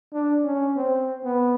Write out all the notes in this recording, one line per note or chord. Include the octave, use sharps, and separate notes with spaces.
D4
C#4
C4
B3